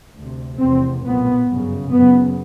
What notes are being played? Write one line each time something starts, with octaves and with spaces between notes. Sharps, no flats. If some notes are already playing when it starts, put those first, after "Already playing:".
D2 C3
F1 E2 C3 C4
B1 A#2 B3
G1 F#2 C#3
F#1 F#2 C#3 B3